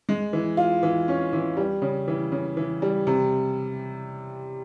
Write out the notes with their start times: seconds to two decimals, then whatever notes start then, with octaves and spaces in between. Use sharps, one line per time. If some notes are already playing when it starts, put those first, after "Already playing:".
0.09 G#3
0.33 E3
0.57 F4
0.83 E3
1.08 C#4
1.33 E3
1.57 G3
1.82 C#3
2.08 E3
2.32 C#3
2.57 E3
2.82 G3
3.07 C3